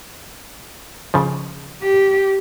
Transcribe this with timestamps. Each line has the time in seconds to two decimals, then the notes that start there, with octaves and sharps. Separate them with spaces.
1.14 C#3 F3
1.83 G4